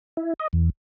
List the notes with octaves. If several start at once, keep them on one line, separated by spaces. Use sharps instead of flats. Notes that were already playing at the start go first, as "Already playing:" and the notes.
E4
D#5
E2